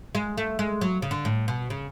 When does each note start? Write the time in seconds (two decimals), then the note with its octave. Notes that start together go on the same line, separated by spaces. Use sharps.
0.15 G#3
0.37 A3
0.59 G#3
0.81 F#3
1.02 C#3
1.11 D3
1.25 A2
1.48 B2
1.70 C#3